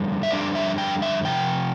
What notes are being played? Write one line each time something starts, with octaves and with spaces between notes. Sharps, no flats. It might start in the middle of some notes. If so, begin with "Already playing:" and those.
Already playing: F2 D3 G3 D4
E5
F2 D3 G3 D4 D5
E5
G5
E5
C3 F3 G5